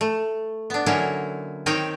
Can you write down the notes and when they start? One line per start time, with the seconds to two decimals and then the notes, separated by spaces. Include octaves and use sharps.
0.01 A3
0.70 B3 D4
0.86 D3 F#3 A#3 C#4 D#4 E4
1.66 D#3 C4 D#4 C#5 G5